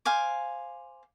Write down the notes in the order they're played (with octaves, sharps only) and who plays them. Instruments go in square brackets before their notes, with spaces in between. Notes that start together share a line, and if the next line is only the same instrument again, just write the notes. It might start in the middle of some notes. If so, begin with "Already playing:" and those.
[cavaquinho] C5 F5 G#5 D6